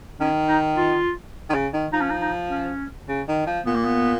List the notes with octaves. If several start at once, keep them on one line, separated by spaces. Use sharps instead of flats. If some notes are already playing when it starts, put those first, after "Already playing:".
D#3 C#4
D#4
F4
D#3
C#3
D#3
F3 D#4
C#4
D#4
D#4
C#4
C#3
D#3
F3
A#2 B3
A#3
B3